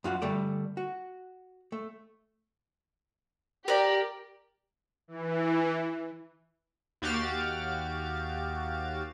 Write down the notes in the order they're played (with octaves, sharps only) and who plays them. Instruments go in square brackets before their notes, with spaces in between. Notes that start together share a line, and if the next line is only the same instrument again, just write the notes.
[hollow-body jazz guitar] F#2 F4 F#4 F#5
D3 G3 A3 D5
F#4
A3
[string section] G4 [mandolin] A#4 D5
[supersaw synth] E3
[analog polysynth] D#2 F#4 G4 F5 A6 D7